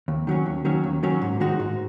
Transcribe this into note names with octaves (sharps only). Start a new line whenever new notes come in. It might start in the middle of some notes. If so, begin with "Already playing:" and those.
D#2
D#3 F#3 C#4
D#2
D#3 F#3 C#4
D#2
D#3 F#3 C#4
G#2
D#3 G#3 D#4 F#4
G#2